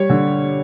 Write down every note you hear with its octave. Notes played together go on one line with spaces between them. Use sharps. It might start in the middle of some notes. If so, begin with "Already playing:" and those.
Already playing: G3 C#5
D3